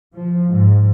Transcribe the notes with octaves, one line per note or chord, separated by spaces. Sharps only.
F3
G#2